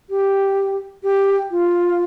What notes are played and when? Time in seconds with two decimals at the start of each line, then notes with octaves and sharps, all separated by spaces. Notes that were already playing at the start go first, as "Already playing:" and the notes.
0.10 G4
1.03 G4
1.51 F4